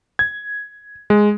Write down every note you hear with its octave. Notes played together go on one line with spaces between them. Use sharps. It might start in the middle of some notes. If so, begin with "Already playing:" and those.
G#6
G#3